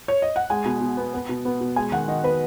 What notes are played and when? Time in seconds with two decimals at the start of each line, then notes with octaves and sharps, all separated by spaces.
0.08 C#5
0.22 D#5
0.36 F#5
0.50 G#3 G#5
0.65 B2
0.81 B2
0.97 B3
1.14 B3
1.29 B2
1.45 B3
1.61 B2
1.76 G#3 G#5
1.92 D#3 F#5
2.08 D#3 D#5
2.24 B3 B4